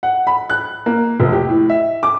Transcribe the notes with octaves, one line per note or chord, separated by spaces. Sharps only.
F#5
B5
F#6
A#3
F1
G4
A2
E5
D6